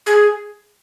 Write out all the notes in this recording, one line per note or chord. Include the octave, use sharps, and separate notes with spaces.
G#4